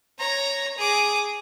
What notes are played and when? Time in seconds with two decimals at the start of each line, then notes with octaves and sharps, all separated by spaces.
0.19 C#5 A#5
0.78 G#4 D6